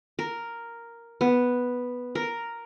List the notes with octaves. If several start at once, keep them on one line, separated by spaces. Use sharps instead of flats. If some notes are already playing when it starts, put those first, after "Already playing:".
A#4
B3
A#4